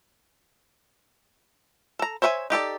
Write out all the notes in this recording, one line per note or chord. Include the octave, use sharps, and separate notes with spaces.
A4 A#5
C5 C#5 E5 F#5 G#5
D#4 G4 A4 D5